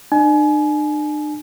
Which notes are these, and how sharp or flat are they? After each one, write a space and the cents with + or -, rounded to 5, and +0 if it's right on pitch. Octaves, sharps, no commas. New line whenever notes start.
D4 +40 G#5 +30